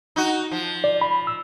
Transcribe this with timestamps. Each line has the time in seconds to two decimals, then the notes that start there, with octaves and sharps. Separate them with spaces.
0.16 D#4 F#4
0.51 F3
0.84 D5
1.01 B5
1.27 E6